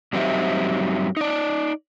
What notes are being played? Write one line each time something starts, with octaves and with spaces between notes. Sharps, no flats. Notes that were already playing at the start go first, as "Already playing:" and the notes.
G2 F#3 C4 D#4 G4 E5
D#4 D5